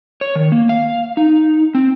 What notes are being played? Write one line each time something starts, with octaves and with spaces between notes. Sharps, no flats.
C#5
D#3
A#3
F5
D#4
C4